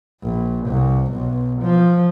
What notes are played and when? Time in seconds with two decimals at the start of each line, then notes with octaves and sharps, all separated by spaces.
0.22 A#1
0.68 C2
1.12 B1
1.62 F3